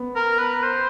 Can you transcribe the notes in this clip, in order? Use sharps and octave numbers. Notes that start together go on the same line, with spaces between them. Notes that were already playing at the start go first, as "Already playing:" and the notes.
Already playing: B3
A#4
B4
C5